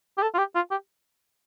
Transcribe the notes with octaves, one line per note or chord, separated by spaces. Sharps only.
G4
A4
F4
G4
F4
G4